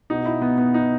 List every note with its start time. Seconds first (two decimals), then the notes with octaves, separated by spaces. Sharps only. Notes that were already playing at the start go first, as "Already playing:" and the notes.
0.10 B2 D#4
0.26 E4
0.42 B3
0.58 B3
0.74 D#4